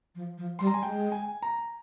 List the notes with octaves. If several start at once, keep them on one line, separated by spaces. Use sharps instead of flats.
F3
F3
G3 C6
A#5
G#5
G#3 G5
G#5
A#5